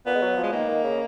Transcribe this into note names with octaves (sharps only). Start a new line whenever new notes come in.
A#2 B3
G#3
F#3
F3
G#3
D#3 A#3
D#3
C#3